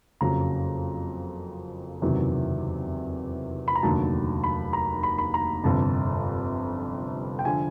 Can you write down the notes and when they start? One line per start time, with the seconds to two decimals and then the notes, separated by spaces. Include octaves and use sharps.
0.21 F#1 F2 C#3 F#3 A#5
2.02 F#1 E2 C3 D#3 F#3
3.68 B5
3.76 A#5
3.83 F1 D#2 D3 F#3 A5
4.44 B5
4.73 A#5
5.03 B5
5.18 B5
5.34 A#5
5.64 G1 F2 C3 A5
7.39 G5
7.45 D3 F3 G#5